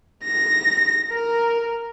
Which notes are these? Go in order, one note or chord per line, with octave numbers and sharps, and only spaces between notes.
A#6
A#4